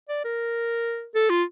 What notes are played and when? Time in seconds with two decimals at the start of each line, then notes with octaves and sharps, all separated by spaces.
0.09 D5
0.24 A#4
1.15 A4
1.30 F4